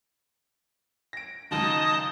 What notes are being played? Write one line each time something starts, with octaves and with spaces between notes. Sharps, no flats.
A#6 D7
C#2 F#2 D#3 D#5 A5 D#6